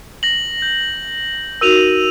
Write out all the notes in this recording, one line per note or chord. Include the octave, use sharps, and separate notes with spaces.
A#6 F#7
G6
D#4 F#4 A#4 E6 D#7 F7